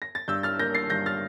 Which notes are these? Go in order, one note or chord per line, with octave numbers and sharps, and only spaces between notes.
A#6
A6
G2 E6 G6
F6 A6
A#3 G6 A#6
A6 C7
G2 G6 A#6
F6 A6